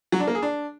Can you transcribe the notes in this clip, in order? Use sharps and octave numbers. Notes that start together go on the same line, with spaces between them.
F#3
D4
A#3
G#4
D4